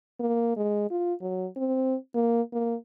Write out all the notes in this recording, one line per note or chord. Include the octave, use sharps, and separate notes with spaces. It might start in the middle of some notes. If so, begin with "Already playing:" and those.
A#3
G#3
F4
F#3
C4
A#3
A#3